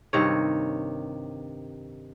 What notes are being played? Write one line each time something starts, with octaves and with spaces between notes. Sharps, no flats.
G2 C3 D#3 C#5